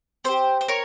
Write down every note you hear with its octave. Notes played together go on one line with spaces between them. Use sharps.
C4 G4 C5
C5
A#4 C#5